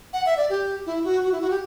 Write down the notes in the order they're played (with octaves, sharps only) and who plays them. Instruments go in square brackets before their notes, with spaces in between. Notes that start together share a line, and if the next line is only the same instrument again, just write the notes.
[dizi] F#5
E5
D5
G4
E4
F#4
F#4
E4
F#4
G4